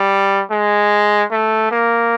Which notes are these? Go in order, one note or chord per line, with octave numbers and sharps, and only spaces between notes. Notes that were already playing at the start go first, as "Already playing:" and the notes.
Already playing: G3
G#3
A3
A#3